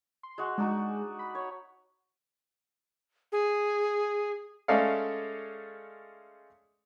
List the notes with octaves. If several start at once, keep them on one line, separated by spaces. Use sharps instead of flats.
C6
G#3 F#4
G#3 D4 D#4 F#4
B5
C#5
G#4
G#3 A3 C#4 A4 D5 F5